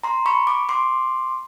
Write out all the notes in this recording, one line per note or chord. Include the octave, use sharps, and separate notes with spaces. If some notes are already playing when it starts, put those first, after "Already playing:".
A#5 C6
B5 C#6
D6
C6 D6